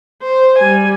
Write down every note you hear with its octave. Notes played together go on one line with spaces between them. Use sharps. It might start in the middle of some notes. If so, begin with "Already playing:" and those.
C5
G3 G#5